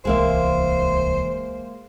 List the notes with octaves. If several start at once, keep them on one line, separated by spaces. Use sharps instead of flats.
D1 C2 E3 G#3 A#3 C5 E5